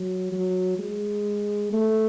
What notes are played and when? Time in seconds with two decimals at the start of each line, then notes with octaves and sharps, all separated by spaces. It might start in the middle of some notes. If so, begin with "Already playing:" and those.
Already playing: F#3
0.32 F#3
0.79 G#3
1.73 A3